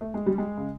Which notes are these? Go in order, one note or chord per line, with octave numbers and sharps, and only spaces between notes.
A3
G#3
G3
G#3
C#3